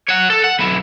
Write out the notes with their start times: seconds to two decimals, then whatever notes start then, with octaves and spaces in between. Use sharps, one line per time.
0.09 C#5 F#5
0.30 A4
0.44 F#5
0.59 B1 E4